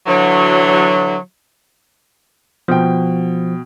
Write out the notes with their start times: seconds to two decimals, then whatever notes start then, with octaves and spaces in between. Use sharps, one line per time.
0.07 D3 E3 F#3
2.68 B2 F3 G5